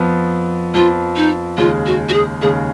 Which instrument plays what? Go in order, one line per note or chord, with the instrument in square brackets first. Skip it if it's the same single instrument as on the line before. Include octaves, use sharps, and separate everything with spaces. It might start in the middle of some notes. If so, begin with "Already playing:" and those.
Already playing: [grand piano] F2 F3 B3
[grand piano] F2 F3 B3 [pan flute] F4
[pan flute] D#4
[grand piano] D#2 C#3 G#3 [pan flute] F4
[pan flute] F#4
F#4
G#4
[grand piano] D#2 C#3 G#3 [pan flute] G#4